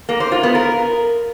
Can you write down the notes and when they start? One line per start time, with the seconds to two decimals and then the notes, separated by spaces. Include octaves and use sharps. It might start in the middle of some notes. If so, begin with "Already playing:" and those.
0.09 A#3
0.20 C5
0.32 F4
0.43 B3
0.55 A#4